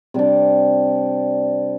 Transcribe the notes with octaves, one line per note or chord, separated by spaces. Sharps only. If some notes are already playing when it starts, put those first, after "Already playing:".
C3 G3 D4